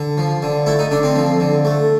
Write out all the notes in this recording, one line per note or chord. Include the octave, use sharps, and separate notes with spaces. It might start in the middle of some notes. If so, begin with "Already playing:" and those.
Already playing: D3
F3
D3
A3 E4
D#4
D3 D4
C4
F3
D3
A3